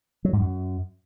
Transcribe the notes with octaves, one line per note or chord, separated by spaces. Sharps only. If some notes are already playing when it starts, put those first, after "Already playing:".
F#3
G#2
F#2